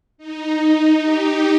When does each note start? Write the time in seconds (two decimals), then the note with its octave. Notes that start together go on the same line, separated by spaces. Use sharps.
0.18 D#4
1.01 G4